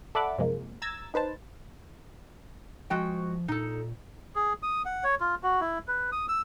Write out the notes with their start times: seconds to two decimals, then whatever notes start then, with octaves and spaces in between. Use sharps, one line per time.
0.15 A4 D5 E5 F#5 B5 D6
0.38 F#2 C3 F3 G#3 A#3
0.82 A#5 E6 G#6 A6
1.14 D#4 B4 C5 A5
2.90 F3 G#3 F#4 G5
3.48 A#2 D#4 A4
4.35 G#4
4.63 D#6
4.86 F#5
5.04 C#5
5.21 F4
5.43 F#4
5.61 E4
5.88 B4
6.12 D#6
6.28 E6